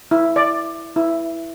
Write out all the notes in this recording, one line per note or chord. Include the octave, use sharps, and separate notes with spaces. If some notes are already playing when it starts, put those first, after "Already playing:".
E4
D5
E4